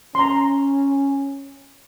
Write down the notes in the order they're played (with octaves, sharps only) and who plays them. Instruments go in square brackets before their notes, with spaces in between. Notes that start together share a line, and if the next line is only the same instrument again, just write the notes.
[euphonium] C#4 [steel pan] A#5 C6